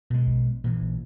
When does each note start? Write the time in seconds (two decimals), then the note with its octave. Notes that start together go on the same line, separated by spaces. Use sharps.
0.10 B2 G#3
0.27 A#1
0.64 A#2 E3